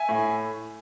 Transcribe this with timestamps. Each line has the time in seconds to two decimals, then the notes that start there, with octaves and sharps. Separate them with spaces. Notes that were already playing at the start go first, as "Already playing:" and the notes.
Already playing: E5 G#5
0.09 A2